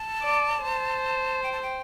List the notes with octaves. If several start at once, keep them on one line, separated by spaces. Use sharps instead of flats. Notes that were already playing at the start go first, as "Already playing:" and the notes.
Already playing: A5
D5
C5
G5
A5
G5